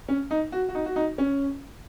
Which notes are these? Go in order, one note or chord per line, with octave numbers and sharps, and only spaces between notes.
C#4
D#4
F#4
F#4
D#4
F#4
D#4
C#4